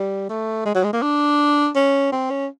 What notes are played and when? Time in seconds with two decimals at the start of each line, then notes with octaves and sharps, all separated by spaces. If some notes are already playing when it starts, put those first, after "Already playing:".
Already playing: G3
0.29 A3
0.66 G#3
0.75 F#3
0.84 G#3
0.93 A#3
1.02 D4
1.76 C#4
2.12 C4
2.31 C#4